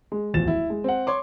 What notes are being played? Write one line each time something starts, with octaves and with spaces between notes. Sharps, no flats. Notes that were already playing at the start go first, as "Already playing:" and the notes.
G#3
D1 E2 F3 A6 E7
E4
G#3
C4 F#5
C#5 C6 D6